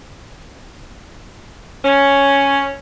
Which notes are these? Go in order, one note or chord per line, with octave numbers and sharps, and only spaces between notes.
C#4